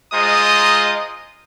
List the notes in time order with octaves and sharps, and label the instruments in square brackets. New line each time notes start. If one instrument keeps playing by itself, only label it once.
[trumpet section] G#3 F4 C5 D#5 A#5 D#6